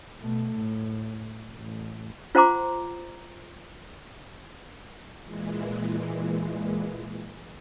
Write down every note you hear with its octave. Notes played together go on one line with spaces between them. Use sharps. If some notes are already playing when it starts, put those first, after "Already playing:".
B2 A3
A2
A1
F4 C5 F#5 A#5 C6 D6
A#2 E3 G#3